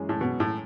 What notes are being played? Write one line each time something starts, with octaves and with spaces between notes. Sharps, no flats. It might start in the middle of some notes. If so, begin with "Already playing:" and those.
Already playing: F#2 E3 G#3 C#4 G#4
A2
B2
A2